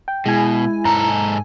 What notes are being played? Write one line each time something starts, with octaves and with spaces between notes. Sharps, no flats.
G5
B2 G#3 E4 G#5
G#2 A4 A#5